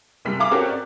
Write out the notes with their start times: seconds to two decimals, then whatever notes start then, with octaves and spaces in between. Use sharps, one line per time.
0.25 F#1 C3 G3 B6
0.39 G#4 E5 F5 A#5 D6
0.51 C4 C#4 F#4 G4 A4 A#4
0.69 D5